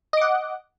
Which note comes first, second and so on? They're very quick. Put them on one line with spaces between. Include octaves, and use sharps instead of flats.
D#5 D6 F#5